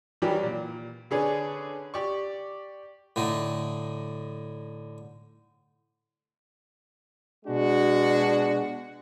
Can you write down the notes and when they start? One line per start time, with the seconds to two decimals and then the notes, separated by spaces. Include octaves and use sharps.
0.22 D#3 E3 F#3 G3 G4
0.43 A#2
1.11 D3 C#4 G#4 B4 C#5 D5
1.94 G4 D5 C#6
3.16 A2 D3 D#4
7.45 B2 G#3 D4 F#4